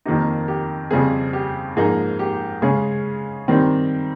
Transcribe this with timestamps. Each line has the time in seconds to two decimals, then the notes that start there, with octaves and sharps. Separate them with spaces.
0.05 F2 D#3 A#3 D#4 G4
0.48 G4
0.91 F2 C#3 G3 C4 G#4
1.33 G4
1.76 G#2 F3 A#3 D#4 G#4
2.19 G4
2.62 C#3 G#3 C#4 G#4
3.48 D#3 G3 C4 D#4